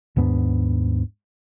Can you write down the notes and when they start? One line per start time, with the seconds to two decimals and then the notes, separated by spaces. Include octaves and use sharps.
0.16 D#2 G#2 B3 D4